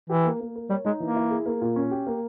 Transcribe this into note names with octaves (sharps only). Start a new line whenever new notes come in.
E3 G4
A#3
A#3
A#4
G3 C#5
G#3 D#4
E3 A#3
E4
G#4
A#3
A#2
C#4
G4
A#3